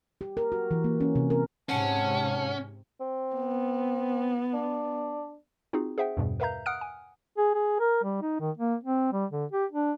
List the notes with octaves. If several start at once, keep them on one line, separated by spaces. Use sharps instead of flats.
G4
A#4
F#4
E3
A#3
C#4
C3
A#4
G#2 C3 C#4 F#5 A5
C4
B3
D4
C4 D#4 F4 F#4 G#4
G#4 C5 E5 F#5 G5
E2 G2 B2 G3
A#4 B4 E5 F5 A#5 G6
F#5 D#6 F6 F#6 D7
G#5
G#4
G#4
A#4
G3
D#4
D#3
A#3
C4
G3
D3
G4
D4